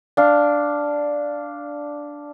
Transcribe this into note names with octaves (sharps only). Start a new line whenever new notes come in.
D4 F5